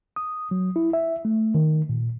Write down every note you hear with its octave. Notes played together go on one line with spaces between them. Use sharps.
D#6
F#3
E4
E5
A3
D#3
A#2